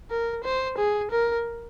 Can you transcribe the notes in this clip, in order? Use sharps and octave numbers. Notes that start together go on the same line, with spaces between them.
A#4
C5
G#4
A#4